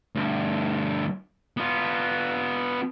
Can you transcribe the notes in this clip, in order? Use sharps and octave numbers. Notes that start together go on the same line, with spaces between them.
D2 G2
B3 F4